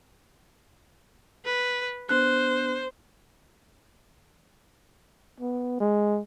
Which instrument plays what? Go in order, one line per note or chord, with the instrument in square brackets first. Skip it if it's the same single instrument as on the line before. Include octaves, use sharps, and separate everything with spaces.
[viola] B4
[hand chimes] B3 D4 F#6 [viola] C5
[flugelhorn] B3
G#3